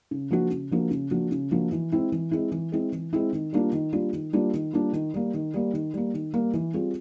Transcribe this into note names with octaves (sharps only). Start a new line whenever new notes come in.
C#3
F3 A#3 D4 F#4
C#3
F3 A#3 D4 F#4
C#3
F3 A#3 D4 F#4
C#3
F3 A#3 D4 F#4
E3
G#3 C4 E4
E3
G#3 C4 E4
E3
G#3 C4 E4
E3
G#3 C4 E4
D#3
G3 A#3 D4 F4
D#3
G3 A#3 D4 F4
D#3
G3 A#3 D4 F4
D#3
G3 A#3 D4 F4
D#3
G3 A#3
D#3
G3 A#3
D#3
G3 A#3
D#3
G3 A#3
E3
G3 C4 F4 G#4